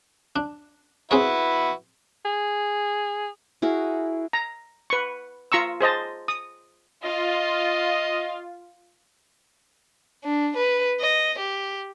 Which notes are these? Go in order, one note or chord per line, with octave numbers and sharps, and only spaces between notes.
D4
C4 E4 F#4 G#4 B4 C#5
G#4
E4 F#4 G#4 A#4
A#5
B4 C#6
F4 A#5 C#6 E6
G#4 C5 D#5 A5
D#6
F4 D#5
D4
B4
D#5
G4